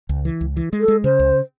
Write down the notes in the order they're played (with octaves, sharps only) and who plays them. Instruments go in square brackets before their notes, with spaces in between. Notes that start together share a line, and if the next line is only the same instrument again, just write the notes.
[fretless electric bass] C#2
E3
C#2
E3
G#3
[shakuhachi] A4
[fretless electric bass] G#3
[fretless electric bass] C#3 [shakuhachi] C5
[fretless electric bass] C#2